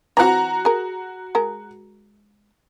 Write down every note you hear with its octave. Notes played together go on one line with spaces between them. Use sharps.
E3 C4 F#4 F#5 A#5
G#4 A#4
G#3 A#4